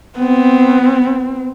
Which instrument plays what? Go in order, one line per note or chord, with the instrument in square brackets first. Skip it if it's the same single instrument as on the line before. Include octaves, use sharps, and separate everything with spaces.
[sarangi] B3 [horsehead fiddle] C4